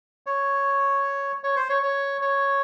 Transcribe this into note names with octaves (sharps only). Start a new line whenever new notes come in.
C#5
C#5
C5
C#5
C#5
C#5